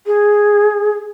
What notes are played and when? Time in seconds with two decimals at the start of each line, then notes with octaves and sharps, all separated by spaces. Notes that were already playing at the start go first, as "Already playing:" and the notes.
0.06 G#4